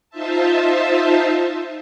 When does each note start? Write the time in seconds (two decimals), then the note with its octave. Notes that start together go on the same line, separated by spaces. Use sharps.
0.10 D#4 F4 C5 E5 A5